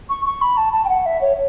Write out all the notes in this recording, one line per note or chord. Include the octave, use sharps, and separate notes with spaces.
C#6
C#6
B5
A5
A5
G5
F#5
E5
C#5